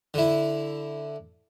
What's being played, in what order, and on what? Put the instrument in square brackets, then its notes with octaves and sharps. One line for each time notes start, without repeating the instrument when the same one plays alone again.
[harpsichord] D3 E4